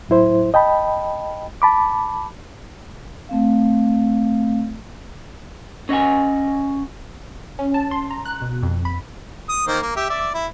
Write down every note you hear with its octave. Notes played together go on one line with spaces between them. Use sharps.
A2 F#3 E4 C5
D#5 G5 A5 B5
A5 B5 D6
A3 C4 F5
C#4 D#5 F#5 G#5
C#4
A5
C6
A#5
F#6
B2
F2
B5
D#6
D#3 A#3 C5
A#3
G4 E5
D5 E5
E4